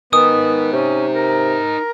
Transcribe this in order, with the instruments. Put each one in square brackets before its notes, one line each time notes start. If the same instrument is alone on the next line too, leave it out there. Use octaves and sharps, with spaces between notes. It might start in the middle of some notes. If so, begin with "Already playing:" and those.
[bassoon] D#3 [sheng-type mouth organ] B3 [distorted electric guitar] D#4 G#5 [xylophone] D#6
[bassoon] C3 [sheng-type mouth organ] C#4
[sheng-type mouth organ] A#4